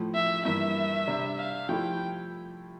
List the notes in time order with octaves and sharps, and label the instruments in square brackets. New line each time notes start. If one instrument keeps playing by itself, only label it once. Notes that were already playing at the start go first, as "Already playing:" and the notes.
Already playing: [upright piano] A2 F3 A3
[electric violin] E5
[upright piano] G2 E3 A#3 [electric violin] E5
[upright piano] C3 G3 D4
[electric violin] F5
[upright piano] F3 A3 E4 G4 [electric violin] G5